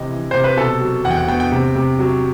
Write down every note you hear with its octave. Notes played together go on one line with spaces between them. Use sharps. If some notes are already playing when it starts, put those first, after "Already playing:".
Already playing: C3 E3 D#5
E3
C3 C5
B4
B2 A4
F#3
E2 F#5
G5
F#5
B3 G5
G5
C3
C3
F#3